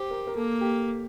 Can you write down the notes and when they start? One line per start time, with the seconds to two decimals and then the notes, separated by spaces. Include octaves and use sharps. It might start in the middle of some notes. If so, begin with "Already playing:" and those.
Already playing: G4 C5
0.11 A#4
0.27 A#4
0.36 A#3 A4
0.61 G4